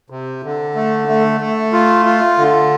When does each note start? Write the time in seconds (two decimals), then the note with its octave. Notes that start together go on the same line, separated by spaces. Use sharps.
0.10 C3
0.44 D3
0.75 A3
1.08 A3
1.41 A3
1.73 F4
2.06 F4
2.38 D3